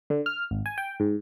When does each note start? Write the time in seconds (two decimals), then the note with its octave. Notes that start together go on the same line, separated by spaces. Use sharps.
0.10 D3
0.26 F6
0.51 G#1
0.66 G#5
0.78 G5
1.00 G#2